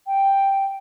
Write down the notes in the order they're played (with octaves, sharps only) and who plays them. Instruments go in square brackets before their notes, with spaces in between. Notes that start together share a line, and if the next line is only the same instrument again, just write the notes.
[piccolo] G5